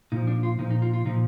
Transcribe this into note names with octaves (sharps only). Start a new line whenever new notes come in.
A#2 F3 D#4
D4
F4
A#2 F3 D#4
D#4
F4
F4
A#2 F3 D#4